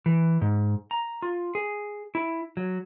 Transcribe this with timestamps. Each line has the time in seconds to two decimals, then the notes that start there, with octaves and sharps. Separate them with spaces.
0.06 E3
0.41 G#2
0.91 A#5
1.22 F4
1.55 G#4
2.15 E4
2.57 F#3